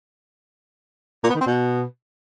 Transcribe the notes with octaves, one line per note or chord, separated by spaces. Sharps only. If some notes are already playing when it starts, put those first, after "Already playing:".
A#2
B3
D#3
C4
B2